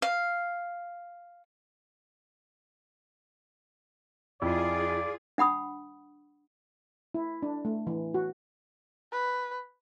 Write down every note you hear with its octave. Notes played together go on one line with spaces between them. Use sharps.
F5
F2 E4 F4 G#4 D5
D4 F#5 B5 D#6
E4
D4
A3
E3
F#4
B4